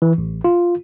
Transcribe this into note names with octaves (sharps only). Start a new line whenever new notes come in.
E3
A1
F4